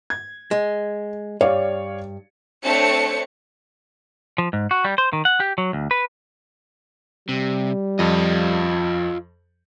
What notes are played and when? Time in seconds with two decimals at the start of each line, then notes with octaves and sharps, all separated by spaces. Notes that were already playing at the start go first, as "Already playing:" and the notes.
0.10 G#6
0.51 G#3
1.41 G2 C#5 D5 F5
2.63 A3 C4 D4 C#5 A5 C#7
4.38 F3
4.53 G#2
4.71 F#4
4.85 G3
4.98 C5
5.13 D#3
5.25 F#5
5.40 G4
5.58 F#3
5.73 D2
5.91 B4
7.29 C3 G3
7.99 F2 F3 F4 D#5